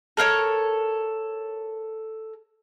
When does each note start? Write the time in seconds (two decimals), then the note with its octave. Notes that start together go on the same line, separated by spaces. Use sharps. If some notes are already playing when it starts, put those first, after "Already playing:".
0.17 A4 A#4 C5 C#5